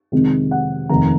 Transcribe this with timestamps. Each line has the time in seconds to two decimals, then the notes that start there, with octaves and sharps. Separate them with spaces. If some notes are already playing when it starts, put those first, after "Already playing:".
0.12 F2 C3 D#3 G#3 C4
0.51 F#5
0.89 F1 D#2 D#3 A#5